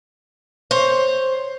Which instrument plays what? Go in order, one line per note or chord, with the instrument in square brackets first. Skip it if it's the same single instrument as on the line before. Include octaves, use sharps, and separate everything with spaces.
[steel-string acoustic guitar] C5 C#5